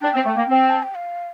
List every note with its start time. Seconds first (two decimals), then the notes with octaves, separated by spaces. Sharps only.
0.02 D4 G5
0.14 C4
0.25 A3
0.36 A#3
0.48 C4
0.70 A5
0.83 G5
0.95 F5